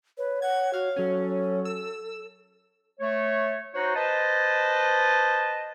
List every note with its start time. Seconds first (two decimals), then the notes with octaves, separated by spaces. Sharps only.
0.18 B4 C#5
0.42 F#5 G#6
0.73 F#4 F5
0.96 F#3 C#4 A4
1.65 E6
3.00 A3 C#5
3.74 D#4 F#4 C5 C#5 F#5
3.95 B4 C5 D#5 A5